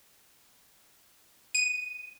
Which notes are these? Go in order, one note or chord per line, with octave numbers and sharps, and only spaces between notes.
D#7